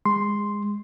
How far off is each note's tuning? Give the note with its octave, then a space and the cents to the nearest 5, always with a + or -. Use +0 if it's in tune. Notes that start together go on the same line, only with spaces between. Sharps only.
G#3 -20 C6 +0